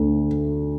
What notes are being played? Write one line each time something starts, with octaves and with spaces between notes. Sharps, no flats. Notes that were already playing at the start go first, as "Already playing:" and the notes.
Already playing: D2 D3 A3